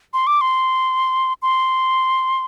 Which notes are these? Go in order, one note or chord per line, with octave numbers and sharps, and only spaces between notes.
C6
D6
C6
C6